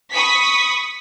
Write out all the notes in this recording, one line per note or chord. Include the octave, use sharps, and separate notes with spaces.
B5 C#6 D#6 B6